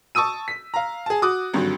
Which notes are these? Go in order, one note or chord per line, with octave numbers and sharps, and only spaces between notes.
A5 C#6 D#6 E6 D#7
B6
F5 A#5
G#4 A5
F#4 D6 D#6 F#6
G#1 G2 D3 F#3